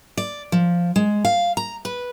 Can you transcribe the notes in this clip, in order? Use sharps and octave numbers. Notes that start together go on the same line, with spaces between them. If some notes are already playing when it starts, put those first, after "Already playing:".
D5
F3
G#3
F5
A#5
B4